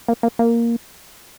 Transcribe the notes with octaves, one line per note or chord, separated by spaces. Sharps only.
A#3
A#3
A#3